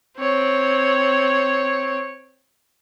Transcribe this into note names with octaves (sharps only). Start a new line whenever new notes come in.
C4 C#5